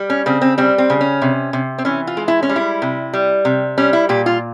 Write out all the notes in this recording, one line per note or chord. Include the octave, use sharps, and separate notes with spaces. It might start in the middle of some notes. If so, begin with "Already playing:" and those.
Already playing: G3
C#4
C#3 C4
C4
G3 C4
C4
C#3
C#4
C3
C3
C4
E3 C#4
F4
G#3
E4
C#4
G3
E4
C3
G3
C3
G3 C#4
E4
A#2 G4
F4